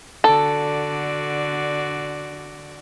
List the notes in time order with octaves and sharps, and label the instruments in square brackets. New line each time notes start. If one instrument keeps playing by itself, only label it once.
[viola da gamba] D3 F#4 D5 [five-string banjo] A4